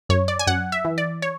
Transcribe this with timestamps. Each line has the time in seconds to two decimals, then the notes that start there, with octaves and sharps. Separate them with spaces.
0.09 F#2 C#5
0.28 D5
0.39 G#5
0.47 F#2 F#5
0.72 E5
0.85 E3
0.98 D5
1.22 C#5